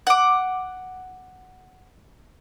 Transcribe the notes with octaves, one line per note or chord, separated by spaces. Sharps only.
F#5 D6